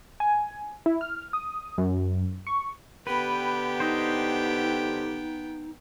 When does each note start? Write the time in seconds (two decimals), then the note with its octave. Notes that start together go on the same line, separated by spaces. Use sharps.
0.20 G#5
0.86 E4
1.01 F6
1.33 D#6
1.78 F#2
2.47 C#6
3.07 D3 B3 G4 B4 G5 B5
3.80 D#4 C5 D#5